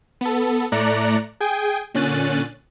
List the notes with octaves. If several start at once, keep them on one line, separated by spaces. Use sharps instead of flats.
B3 A4
A2 A3 D5 A#5 F#6 C#7
G#4 G5 G#5
A#2 D3 C#4 F#6 A6 D#7